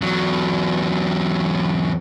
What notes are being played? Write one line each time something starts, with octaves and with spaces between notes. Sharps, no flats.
E2 F#3